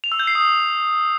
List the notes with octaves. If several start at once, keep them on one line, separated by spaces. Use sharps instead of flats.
F7
E6
G6
C7
D#6